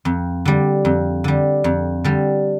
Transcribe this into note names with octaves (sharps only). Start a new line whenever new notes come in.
F2
D3 G3
F2
D3 G3
F2
D3 G3